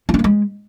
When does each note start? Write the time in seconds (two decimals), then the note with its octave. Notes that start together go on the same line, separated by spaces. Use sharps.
0.09 E4
0.14 D4
0.19 A#3
0.24 G#3